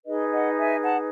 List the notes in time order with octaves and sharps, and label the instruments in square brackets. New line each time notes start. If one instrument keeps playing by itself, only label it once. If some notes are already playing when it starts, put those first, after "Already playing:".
[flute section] D#4 G#4 B4 D#5
D#5 F#5
E5 G#5
F#5 A5